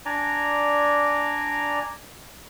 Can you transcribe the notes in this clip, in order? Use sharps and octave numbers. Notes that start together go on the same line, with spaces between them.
D4 D5 G#5 A#5